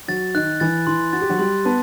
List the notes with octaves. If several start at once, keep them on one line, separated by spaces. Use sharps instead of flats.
F#3 F#4 A6
D#3 D#4 F#6
E3 E4 A6
E3 E4 C6
F#4 A6
G4
F#3 F#4
G3 G4 C6
B3 B4 A5